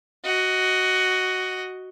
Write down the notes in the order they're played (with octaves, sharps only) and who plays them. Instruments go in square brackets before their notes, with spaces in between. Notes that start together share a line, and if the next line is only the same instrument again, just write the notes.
[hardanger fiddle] F#4 D#5